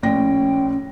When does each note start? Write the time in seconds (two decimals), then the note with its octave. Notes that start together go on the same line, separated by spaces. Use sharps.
0.03 A#1 A2 C#4 G5 A#6